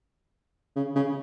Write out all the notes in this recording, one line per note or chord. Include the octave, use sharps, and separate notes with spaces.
C#3
C#3